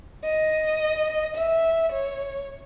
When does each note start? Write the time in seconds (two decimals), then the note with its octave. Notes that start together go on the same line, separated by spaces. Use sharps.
0.25 D#5
1.36 E5
1.92 C#5